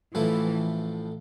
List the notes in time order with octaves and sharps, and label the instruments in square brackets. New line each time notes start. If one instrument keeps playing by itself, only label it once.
[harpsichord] A1 A2 F3 A3 E4 [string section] E3